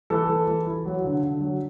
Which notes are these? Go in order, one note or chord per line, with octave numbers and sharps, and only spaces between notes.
E3 A4
E3
E3
E4
F#3
D3
D3
F#3